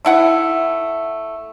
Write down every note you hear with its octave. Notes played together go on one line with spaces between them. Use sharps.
A3 E4 F#5